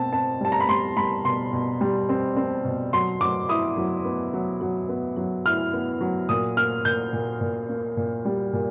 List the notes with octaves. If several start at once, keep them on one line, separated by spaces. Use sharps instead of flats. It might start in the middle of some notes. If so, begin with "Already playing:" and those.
Already playing: B2 C4 A5
C4 A5
G3 A5
A#5
B5
G3 C6
G3 B5
B2 C6
B2
G3
C4
C4
B2
F#3 C6
F#3 D6
E4 D#6
F#3
B3
F#3
F#3
B3
F#3
E4 F6
B3
F#3
A#2 D#6
A#3 F6
A#2 G6
A#2
A#2
A#3
A#2
G3
A#2